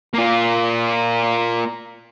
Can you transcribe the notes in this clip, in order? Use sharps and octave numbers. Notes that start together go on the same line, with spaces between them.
A#3 F4